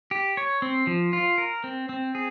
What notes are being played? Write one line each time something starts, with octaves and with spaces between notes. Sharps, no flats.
G4
C#5
C4
F3
F4
A#4
C4
C4
G#4